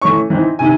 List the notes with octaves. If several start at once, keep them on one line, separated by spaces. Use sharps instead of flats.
E3 A3 C#4 C#6
E3 C4 D#4
C3 D#3 G#5